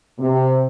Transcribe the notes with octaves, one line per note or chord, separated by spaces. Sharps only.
C3